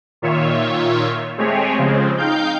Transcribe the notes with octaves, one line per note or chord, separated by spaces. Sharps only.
A#2 D#3 F4 C#5 E5
G#3 A3 C4 G4 G#4 C#5
C#3 F3 G#3 C4
D#4 F5 G5 G6